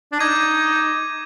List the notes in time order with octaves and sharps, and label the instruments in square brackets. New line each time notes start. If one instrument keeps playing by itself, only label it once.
[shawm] D4
[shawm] D#4 [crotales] D6 G#6 D#7